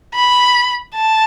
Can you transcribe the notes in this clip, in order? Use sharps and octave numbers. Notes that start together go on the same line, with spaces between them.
B5
A5